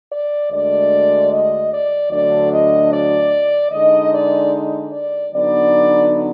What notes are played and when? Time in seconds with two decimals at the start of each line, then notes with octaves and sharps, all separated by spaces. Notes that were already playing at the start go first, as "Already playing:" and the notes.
0.11 D5
0.51 D2 D3 G#3 D5
1.31 D#5
1.71 D5
2.11 D2 D3 F#3 D4 D5
2.51 D#5
2.92 D5
3.71 D3 G#3 D#4 D#5
4.12 D5
4.92 D5
5.32 D3 F#3 B3 D#4 D5